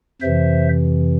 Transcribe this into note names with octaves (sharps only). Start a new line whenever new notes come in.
F2 C3 E3 C5 E5